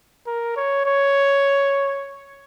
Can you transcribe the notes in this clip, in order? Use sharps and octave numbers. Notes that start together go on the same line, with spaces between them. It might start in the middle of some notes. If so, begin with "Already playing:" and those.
A#4
C#5
C#5